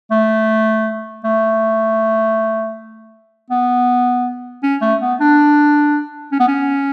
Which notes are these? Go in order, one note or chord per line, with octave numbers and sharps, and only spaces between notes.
A3
A3
B3
C#4
A3
B3
D4
C#4
B3
C#4